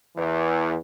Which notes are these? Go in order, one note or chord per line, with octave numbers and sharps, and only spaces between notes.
E2 E3